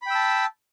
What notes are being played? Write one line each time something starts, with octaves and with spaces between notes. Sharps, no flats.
G5 A5 B5 E6